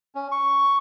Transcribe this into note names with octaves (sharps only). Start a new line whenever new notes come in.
C#4
C#6